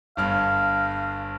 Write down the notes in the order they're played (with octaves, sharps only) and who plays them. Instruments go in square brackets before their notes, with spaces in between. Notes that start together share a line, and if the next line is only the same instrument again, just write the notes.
[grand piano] G1 G2 F6 [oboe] F5